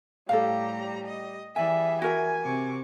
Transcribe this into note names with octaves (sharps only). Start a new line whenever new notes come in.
A2 G3 G4 A4 C5 F5 A#5
D#5
E3 G3 G#4 D5 E5 G#5
F#4 A#4 E5 G#5
C3 C#6 D6